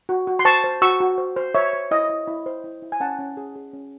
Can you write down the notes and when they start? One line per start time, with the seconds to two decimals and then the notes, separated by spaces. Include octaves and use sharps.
0.09 F#4
0.27 F#4
0.39 C6
0.45 C5 A5 C#6
0.64 C5
0.82 F#4 C#6 E6
1.00 F#4
1.18 C5
1.36 C5
1.55 C5 C#5 E5
1.73 C5
1.91 E4 D#5
2.10 E4
2.28 E4
2.46 C5
2.64 E4
2.82 E4
2.92 G#5
3.00 C#4 F#5 A5
3.19 C#4
3.37 G#4
3.56 G#4
3.73 C#4